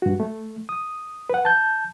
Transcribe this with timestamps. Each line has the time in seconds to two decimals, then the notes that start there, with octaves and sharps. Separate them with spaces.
0.02 G2 F#4
0.20 A3
0.69 D#6
1.30 B4 F#5
1.45 A5 G6